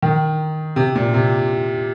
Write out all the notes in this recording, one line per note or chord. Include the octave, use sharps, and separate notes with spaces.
D#3
C3
A#2
C3